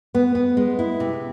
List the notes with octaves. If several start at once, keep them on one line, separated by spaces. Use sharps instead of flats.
B3
B3
G#3
E4
C3